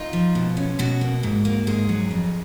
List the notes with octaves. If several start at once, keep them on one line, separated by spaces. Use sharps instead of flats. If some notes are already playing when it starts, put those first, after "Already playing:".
Already playing: D#4 F4
F3
B2
C#4
B2 F#4
A#3
G#2
A#3
G#2 G#4
F#3
F2